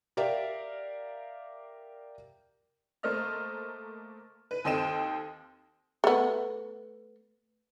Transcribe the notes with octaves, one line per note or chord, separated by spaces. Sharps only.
G4 A#4 D5 E5 F5
A3 A#3 C5 D#5 F6
B4
D#2 C4 A4 D#5 G5 E7
A3 B3